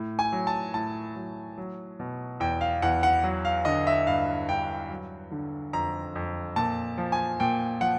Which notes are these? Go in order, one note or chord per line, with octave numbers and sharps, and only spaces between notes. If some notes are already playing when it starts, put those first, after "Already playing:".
Already playing: A2
G#5
F#3
A5
A2 A5
F#3
F#3
B2
E2 G5
F5
E2 F#5
F#5
F#3
F5
D3 D#5
E5
G2 F5
G2 G5
F#3
D3
F2 A#5
F2
A#2 A5
F3
G#5
A#2 G5
F3 F#5